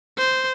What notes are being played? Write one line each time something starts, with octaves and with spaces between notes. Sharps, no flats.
C5